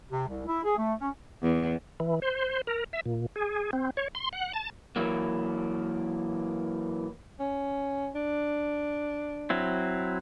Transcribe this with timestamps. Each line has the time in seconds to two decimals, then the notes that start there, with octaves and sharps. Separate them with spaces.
0.09 C3
0.28 C2
0.46 E4
0.64 G#4
0.77 A3
1.00 C#4
1.42 E2
2.00 E3
2.22 C5
2.67 A#4
2.93 E5
3.06 A#2
3.36 G#4
3.73 C4
3.97 C#5
4.15 C6
4.33 F#5
4.53 A5
4.96 E3 F#3 A#3
7.40 C#4
8.15 D4
9.50 F#3 C4 E4